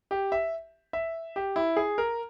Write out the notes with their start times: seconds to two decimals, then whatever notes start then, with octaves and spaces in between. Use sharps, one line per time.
0.11 G4
0.32 E5
0.93 E5
1.36 G4
1.56 E4
1.77 G#4
1.98 A#4